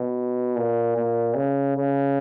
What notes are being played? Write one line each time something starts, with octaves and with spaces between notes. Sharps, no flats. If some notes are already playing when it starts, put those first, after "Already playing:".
Already playing: B2
A#2
A#2
C#3
C#3